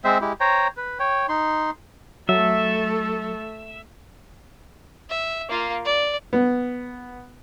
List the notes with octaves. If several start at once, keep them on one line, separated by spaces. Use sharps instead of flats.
G#3 C4 C5 E5
G#3 E4 G4
C5 C#5 G5 A#5
B4
C#5 G5
D#4 C6
F#3 A3 A4 E5
E5
A#3 F4
D5
B3